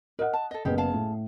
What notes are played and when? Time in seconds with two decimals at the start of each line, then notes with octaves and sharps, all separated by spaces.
0.19 A#4 D#5 F#5
0.33 A5
0.51 A4 D#5
0.65 F#1 B3 G4 G#4 A#4
0.78 G#4 F5 A5
0.94 A2